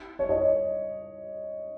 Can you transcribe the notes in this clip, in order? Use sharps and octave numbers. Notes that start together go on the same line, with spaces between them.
C#5
D#5